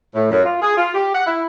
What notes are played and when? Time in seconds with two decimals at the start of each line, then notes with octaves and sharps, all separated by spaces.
0.15 A2
0.31 F#2
0.45 F4
0.62 G#4
0.77 F4
0.95 G4
1.14 F#5
1.27 E4